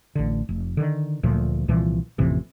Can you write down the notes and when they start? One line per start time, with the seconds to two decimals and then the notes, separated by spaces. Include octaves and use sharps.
0.15 A1 D3
0.49 F1
0.77 D3 D#3
1.23 D1 D2 A#2 F3
1.68 C2 A#2 E3 F3
2.18 A1 F2 C3 E3